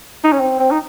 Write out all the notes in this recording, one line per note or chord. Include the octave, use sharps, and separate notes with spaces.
D#4
C#4
C4
C4
D#4